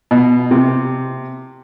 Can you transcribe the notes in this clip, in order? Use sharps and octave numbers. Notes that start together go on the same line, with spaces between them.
B2
C3